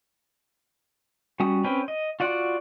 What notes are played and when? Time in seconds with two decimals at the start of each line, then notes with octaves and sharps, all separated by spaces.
1.40 G3 C#4 F#4 D#6
1.64 C4 C#4 B4 G5
1.88 D#5
2.20 F4 F#4 D5 F#5